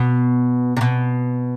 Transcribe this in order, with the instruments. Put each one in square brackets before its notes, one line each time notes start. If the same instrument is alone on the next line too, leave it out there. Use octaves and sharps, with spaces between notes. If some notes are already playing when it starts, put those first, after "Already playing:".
Already playing: [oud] B2
C3
B2